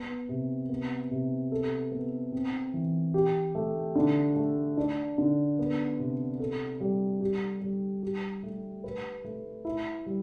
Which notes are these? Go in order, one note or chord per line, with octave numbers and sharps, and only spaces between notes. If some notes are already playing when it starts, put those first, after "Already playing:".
Already playing: B3
C3
B3
C3
A4
B3
C4
E3
G4
A3
D3
A3
D4
D3
B3
C3
A4
G3
G4
G3
G4
A3
B4
A3
E4
G3